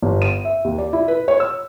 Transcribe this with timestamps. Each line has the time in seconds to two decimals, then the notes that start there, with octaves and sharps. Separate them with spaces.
0.02 G1
0.22 D#7
0.45 E5
0.64 D#2
0.78 D5
0.93 E4
1.08 B4
1.28 C#5
1.40 E6